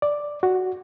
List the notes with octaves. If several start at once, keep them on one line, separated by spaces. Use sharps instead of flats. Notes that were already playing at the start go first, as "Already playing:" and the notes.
D5
F#4